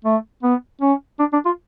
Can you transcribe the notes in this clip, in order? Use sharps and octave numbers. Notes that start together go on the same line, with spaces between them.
A3
B3
C#4
D4
D4
F4